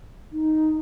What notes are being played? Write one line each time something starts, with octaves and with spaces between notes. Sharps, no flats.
D#4